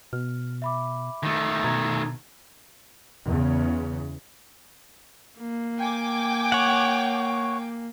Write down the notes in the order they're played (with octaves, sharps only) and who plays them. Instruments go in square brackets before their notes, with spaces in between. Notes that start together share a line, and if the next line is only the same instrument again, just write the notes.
[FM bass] B2 [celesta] F6
[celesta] E5 B5 D6
[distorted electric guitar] D#3 A3
[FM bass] B2 [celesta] A#5 G#6
[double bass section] E2 C#3
[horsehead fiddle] A#3
[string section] G5 G#5 D6
[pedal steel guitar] C#5 F#5